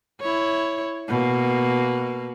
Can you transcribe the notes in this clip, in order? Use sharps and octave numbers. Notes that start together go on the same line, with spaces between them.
E4 C#5
B2 A#3